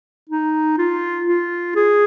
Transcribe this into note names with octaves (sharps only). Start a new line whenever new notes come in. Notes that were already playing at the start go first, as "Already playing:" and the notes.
D#4
F4
F4
G#4